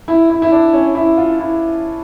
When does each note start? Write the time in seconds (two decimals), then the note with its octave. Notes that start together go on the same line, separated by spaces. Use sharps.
0.08 E4
0.30 E4
0.42 E4
0.52 D4
0.73 C#4
0.95 E4
1.17 F4
1.39 E4